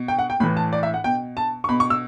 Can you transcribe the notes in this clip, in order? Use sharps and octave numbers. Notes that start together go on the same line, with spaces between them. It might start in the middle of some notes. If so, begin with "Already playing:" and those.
Already playing: B2
G5
F#5
G5
A2 E3 B5
A5
D5
E5
F#5
B2 G5
A5
C#6
B2 B5
C#6
E6